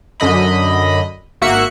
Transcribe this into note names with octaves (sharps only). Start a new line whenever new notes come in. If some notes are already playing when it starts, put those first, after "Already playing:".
F#2 D3 D#5 B5
G#1 A#3 F#4 E5 F#6 C#7